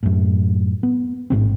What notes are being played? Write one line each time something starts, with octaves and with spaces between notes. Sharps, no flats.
F#2 A2
B3
A1 G#2 C3 C4